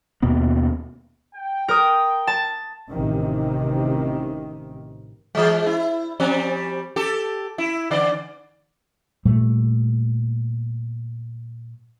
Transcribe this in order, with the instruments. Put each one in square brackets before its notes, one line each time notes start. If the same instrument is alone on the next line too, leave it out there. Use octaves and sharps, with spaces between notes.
[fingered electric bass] D#2 B2 A#3 B3
[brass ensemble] G5
[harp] A#4 D#6
A5
[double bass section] A1 C3 D#3
[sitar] E3 G#3
E4
F3 G3 C4
G4 A4
E4
D3 D5
[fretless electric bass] A#2 G3 A3